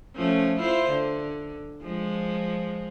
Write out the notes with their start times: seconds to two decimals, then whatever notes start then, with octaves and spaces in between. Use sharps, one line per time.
0.15 F3 A3 C#4
0.59 E4 F4 C5
0.90 D3
1.83 F3 G#3